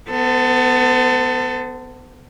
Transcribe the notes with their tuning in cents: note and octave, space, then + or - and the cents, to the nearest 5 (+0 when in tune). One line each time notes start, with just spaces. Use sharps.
B3 +15 A4 +20 C5 -40